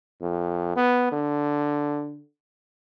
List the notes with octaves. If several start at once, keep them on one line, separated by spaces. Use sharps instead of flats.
F2
B3
D3